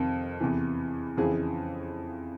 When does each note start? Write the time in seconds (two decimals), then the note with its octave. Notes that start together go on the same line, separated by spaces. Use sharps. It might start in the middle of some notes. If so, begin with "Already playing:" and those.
Already playing: F2 C3 D#3
0.41 E2 C3 E3
1.17 F2 C#3 E3 G#4